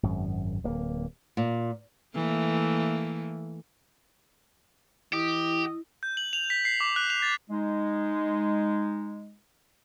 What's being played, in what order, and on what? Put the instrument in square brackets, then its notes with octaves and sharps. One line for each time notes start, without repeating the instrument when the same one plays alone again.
[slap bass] G#1 F#2
D1 A#3
[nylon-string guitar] A#2
[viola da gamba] E3 A3 A#3
[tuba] E3 [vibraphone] E4 [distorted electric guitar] G4 [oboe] D#5
[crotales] G6
F#7
F7
B6
C7
D6
F#6
F7
A6
[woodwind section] G#3 D#4